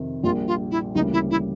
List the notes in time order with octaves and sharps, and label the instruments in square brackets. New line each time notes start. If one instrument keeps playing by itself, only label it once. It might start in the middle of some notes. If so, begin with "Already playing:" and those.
Already playing: [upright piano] F2 C3 D#3
[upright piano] A#1 A#2 G3 A#3 [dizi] F4
[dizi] F4
E4
[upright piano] D2 C#3 E3 G3 A#3 [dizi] D#4
[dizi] E4
E4